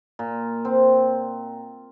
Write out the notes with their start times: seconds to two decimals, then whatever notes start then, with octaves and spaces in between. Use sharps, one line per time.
0.19 A#2
0.65 C4